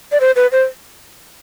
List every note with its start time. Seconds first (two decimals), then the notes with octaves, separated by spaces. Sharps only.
0.12 D5
0.20 C5
0.36 B4
0.52 C5